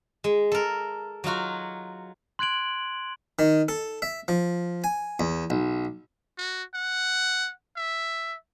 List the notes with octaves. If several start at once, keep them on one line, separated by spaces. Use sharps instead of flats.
G#3
A4 A#4
F#3 D#4 F4 F#4
C6 F#6 G#6 D7 F#7
D#3
A4
E5
F3
G#5
E2
B1
F#4
F#5
E5